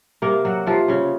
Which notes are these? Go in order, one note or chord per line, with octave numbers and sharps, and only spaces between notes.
C3 A#3 A#4
F#3 F#4
C3 F3 F4
C#3 C#4